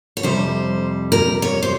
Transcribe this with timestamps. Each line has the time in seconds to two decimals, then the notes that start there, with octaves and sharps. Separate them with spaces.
0.17 C#5
0.23 F2 C3 G3 C5
1.12 A#4
1.42 C#5
1.63 C5